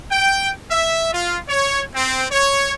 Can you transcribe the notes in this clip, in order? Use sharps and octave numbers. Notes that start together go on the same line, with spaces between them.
G5
E5
F4
C#5
C4
C#5